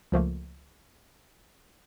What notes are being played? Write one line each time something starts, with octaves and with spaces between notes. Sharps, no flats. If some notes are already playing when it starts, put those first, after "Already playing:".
C#2 F3 A3 A#3